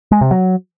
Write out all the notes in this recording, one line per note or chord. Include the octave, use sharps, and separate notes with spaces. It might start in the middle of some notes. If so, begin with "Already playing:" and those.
G#3
C3
F#3